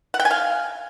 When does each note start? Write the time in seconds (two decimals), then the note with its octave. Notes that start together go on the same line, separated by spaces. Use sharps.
0.14 F#5
0.20 G5
0.25 G#5
0.31 F5